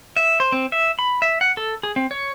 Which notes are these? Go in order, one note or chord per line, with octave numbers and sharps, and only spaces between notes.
E5
C5
C4
E5
B5
E5
F#5
A4
G#4
C4
C#5